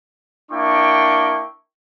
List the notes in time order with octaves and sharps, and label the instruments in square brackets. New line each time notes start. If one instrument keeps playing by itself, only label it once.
[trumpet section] A#3 D4 E4 G5 C#6